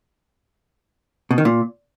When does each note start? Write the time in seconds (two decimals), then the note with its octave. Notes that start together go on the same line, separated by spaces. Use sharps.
1.31 B2
1.38 D#3
1.45 A#2